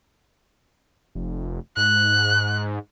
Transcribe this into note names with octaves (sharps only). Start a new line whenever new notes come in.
F1
G#2 F#6